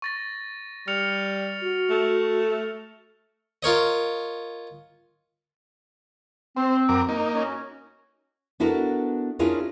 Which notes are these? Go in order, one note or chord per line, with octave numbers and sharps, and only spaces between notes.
C#6 A6 A#6
G3 F6 C#7 F7
F#4
A3
F4 A#4 C#5 D#5
C4 C5
F#2 A#4 D6
A#3 D#4
C#4 F#4
B3 D4 E4 F#4 A4 A#4
C#4 D4 E4 F4 G#4 A#4